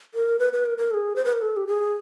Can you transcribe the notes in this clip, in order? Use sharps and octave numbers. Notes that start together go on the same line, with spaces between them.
A#4
B4
B4
A#4
A#4
A4
G#4
C5
B4
A#4
A4
G4
G#4